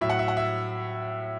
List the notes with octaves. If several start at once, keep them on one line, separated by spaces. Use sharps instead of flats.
A2 F#3 E5
F#5
E5
F#5
E5